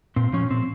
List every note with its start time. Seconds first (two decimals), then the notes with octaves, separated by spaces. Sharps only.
0.16 A#2 C4
0.33 F3 C#4
0.50 A#2 C4